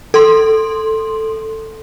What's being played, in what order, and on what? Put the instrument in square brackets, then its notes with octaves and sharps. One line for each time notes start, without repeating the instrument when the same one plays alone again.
[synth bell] A4 C6